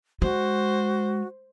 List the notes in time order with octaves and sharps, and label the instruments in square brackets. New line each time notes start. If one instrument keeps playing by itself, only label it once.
[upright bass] G#3 [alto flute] F#4 [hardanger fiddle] C5